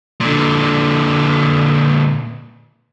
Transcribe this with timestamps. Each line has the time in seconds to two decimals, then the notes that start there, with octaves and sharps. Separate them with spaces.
0.21 A#2 D3